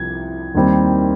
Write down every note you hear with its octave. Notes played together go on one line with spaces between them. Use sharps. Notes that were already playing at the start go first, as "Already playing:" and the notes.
Already playing: C2 C3 F3 G#6
D#2 D#3 G3 C4